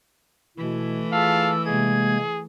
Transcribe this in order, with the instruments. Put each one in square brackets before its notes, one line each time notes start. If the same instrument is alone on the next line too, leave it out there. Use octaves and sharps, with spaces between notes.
[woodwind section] B2 E4 [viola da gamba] E3 A3
[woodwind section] F4 G#4 A5 [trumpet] F5 [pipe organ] E6
[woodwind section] C3 [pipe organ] G#3 A#3 G#6 [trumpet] G#4